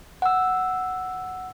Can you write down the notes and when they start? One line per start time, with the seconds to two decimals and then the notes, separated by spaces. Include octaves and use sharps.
0.22 F#5 E6